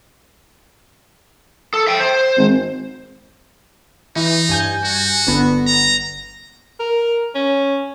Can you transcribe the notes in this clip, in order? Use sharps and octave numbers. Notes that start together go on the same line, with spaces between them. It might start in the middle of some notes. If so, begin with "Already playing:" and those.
A4
E5 G5
C5
G#1
E3 D#4
G2 G#5 G6
F#4
G1 D3 B3
A#5
A#4
C#4